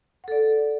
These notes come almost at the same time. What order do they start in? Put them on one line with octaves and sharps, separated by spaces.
F#5 A4 D5